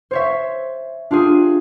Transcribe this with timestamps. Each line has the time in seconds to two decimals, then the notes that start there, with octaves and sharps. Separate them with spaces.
0.11 C5 C#5 E5
1.11 D4 F4 G4 G#4